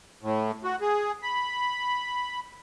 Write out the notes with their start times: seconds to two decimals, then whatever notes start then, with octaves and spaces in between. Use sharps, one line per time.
0.23 A2
0.64 F#4
0.81 G#4
1.23 B5